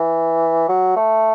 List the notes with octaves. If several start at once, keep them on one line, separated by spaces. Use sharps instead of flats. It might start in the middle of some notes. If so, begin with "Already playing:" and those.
Already playing: E3
F#3
A3